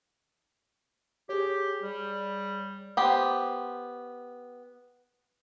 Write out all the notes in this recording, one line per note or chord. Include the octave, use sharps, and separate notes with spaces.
G4 G#4 C#5
G3
B3 G4 C5